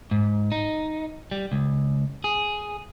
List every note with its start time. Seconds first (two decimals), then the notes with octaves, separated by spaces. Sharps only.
0.11 G#2
0.52 D#4
1.31 G3
1.52 C#2
2.24 G#4